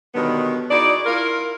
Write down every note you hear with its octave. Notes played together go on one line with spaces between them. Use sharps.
B2 D3 D#3 F#3 G3 B3
D#4 E4 F#4 G#4 D5
E4 F4 A#4